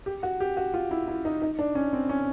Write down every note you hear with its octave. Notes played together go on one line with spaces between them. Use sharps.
G4
F#4
G4
F#4
F4
E4
E4
D#4
D#4
D4
C#4
C4
C#4